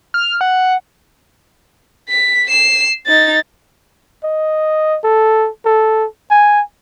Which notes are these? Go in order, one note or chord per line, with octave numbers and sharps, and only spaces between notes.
F6
F#5
B6
C7 E7
D#4 A6
D#5
A4
A4
G#5